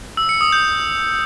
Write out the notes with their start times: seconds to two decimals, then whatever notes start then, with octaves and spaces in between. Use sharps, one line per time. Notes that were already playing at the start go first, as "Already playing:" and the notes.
0.17 E6
0.29 C#7
0.41 D#6
0.52 G6